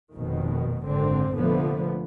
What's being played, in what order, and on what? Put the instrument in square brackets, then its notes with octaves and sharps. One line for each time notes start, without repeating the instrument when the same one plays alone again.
[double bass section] F1 F2 B2 D#3
G#1 F#2 D3 C4
F1 A#2 D3 F3 A3 B3